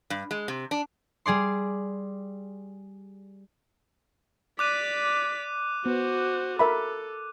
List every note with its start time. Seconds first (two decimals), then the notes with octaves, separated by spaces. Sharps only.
0.10 G2
0.31 G#3
0.48 C3
0.71 D4
1.26 G3 G#4 D5 C6
4.59 D5 D6 F#6 B6 D#7
5.86 B3 F#4 C5
6.59 A4 A#4 E5 B5